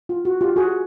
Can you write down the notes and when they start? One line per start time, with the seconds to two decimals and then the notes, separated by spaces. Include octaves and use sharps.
0.09 F4
0.25 F#4
0.41 F4 G4
0.56 F#4 G#4